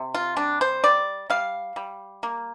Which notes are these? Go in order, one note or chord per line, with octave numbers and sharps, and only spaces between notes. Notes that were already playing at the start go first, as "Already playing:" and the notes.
Already playing: C3
F4
G3 D4
C5
G3 D5
G3 F5
G3
A#3